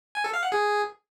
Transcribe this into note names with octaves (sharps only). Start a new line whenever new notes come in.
G#5
A4
F5
F#5
G#4